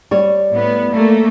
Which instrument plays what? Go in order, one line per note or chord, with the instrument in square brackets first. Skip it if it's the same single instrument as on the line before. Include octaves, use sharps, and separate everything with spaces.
[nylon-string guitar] G3 C#5
[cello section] A2 B3
A3 A#3 A4